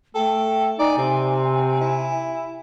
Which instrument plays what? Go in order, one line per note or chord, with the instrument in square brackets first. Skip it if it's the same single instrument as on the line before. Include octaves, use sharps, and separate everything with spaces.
[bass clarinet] A3 [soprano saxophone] A4 [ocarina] G5
[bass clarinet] D#4 [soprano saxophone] D5 [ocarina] G#5
[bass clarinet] C3 [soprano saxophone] C4
[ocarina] G#5
[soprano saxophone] E4